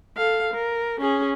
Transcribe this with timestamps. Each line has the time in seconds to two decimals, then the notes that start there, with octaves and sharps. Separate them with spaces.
0.17 A4 F5
0.54 A#4
1.01 C#4 G#4